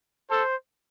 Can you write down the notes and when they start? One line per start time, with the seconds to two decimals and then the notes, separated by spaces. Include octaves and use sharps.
0.30 A4 C5